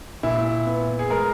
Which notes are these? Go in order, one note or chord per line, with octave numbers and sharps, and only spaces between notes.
A#2 E4
B3
G#4
G#3 A#4